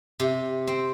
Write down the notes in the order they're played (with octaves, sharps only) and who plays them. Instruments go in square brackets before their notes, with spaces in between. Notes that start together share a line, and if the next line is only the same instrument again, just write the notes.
[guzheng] C3
C4